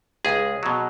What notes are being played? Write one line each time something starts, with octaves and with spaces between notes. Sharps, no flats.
C#2 G#4
B2 F#3